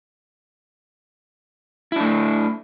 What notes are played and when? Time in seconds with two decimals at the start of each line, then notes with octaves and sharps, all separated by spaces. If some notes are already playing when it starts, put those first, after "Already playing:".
1.92 E4
1.96 D4
2.00 A3